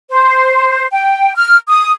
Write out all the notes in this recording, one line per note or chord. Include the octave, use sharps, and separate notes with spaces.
C5
G5
F6
D#6